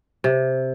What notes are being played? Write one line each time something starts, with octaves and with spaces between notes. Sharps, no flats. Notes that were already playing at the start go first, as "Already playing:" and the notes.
C3